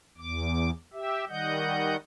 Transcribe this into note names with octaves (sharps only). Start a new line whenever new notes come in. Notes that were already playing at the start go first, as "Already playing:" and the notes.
E2 D6
G4 E5
D#3 G3 D#5 F#5 G6